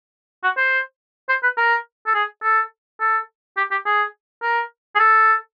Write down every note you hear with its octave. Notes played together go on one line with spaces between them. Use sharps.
F#4
C5
C5
B4
A#4
A4
G#4
A4
A4
G4
G4
G#4
A#4
G#4
A4